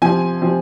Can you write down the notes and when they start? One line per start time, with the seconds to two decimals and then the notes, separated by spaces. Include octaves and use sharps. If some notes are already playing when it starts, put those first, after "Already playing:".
0.02 C3 F3 C4 G#5
0.42 C3 F3 C4